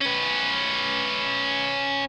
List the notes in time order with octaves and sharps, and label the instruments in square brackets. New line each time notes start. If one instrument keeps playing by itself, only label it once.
[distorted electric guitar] C#4 B4